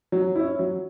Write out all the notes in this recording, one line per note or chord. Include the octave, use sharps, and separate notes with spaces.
F#3
C#4 E4
F#3